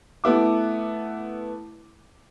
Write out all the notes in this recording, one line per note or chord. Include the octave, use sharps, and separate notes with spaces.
A3 B3 E4 D6